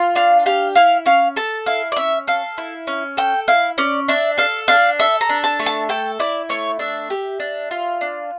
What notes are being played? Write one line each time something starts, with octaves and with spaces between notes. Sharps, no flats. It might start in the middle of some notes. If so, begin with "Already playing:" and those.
Already playing: F4
D4 F5
G4 F5
E4 F5
C#4 F5
A4 A5
E4 F5
D5
C#4 E5
A4 F5
E4
C#4
A4 G5
E4 F5
C#4 D5
D4 E5
A4 F5
D4 F5
A4 E5
A#5
D4
A5
A3
A5
A4 G5
E4 D5
A3 C#5
D4 E5
G4
D4
F4
D4